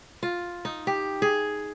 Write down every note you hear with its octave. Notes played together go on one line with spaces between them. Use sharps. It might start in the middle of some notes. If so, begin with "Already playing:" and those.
F4
D#4
G4
G#4